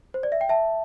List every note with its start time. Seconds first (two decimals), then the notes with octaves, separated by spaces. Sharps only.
0.14 C5
0.23 D5
0.32 E5
0.41 G5
0.49 E5 A5